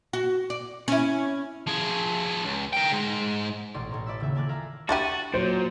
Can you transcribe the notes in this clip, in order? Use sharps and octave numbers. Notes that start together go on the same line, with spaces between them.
F#4
D5
C#4 E4
F3 G#4
C#2
A#4 G5
G#2
A1 B2 A4 D5 C6
A1 A4 C#5 A#5
A4 B4 D5 E5 B5 E6
D#1 C#3 A#3 E5
A4 A#4 G#5 A5 D6 F#6
A#4 E5 F5 A#5
D4 E4 F#4 G4 A6 D#7
A#2 F#3 C5